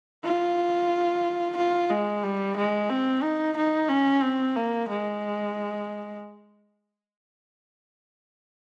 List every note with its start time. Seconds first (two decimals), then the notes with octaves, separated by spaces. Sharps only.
0.24 F4
1.57 F4
1.90 G#3
2.23 G3
2.56 G#3
2.89 C4
3.23 D#4
3.57 D#4
3.89 C#4
4.23 C4
4.56 A#3
4.89 G#3